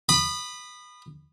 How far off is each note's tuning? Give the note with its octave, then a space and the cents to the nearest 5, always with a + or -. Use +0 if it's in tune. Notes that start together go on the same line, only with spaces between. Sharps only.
B5 +0 D#6 -30